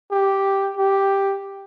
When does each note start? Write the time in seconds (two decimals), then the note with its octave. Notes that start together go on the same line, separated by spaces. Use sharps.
0.12 G4
0.77 G4